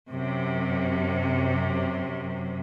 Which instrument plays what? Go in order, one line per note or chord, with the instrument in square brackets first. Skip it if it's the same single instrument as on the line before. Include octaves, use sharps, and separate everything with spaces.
[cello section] F#2 C3